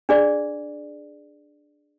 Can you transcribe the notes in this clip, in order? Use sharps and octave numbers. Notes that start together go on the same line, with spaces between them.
D4 G#4 D5